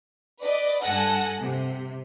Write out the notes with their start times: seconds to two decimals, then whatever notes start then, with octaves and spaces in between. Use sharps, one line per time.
0.41 B4 D5 D#5
0.82 G2 A4 F#5 G#5 F#6 A#6
1.39 C3